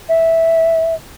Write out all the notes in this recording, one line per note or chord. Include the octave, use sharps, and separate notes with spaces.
E5